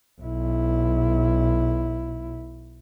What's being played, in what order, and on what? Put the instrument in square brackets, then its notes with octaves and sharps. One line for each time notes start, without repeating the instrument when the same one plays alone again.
[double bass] B1 E4